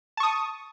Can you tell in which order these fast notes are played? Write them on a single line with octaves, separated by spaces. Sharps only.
A5 C#6 D#6